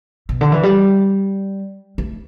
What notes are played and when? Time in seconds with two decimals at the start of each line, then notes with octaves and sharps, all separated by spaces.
0.29 B2
0.41 D3
0.52 E3
0.63 G3
1.98 A3